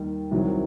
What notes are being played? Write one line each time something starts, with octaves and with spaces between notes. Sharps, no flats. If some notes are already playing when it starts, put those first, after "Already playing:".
Already playing: D#2 D#3 G3 D#4
C2 C3 D#3 F#3